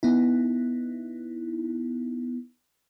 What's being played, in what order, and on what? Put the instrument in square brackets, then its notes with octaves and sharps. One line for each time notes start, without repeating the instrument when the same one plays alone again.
[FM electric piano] B3 D#4 E4